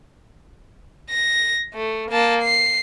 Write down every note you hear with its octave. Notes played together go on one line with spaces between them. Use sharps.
A#6
A3
A#3 A5
C7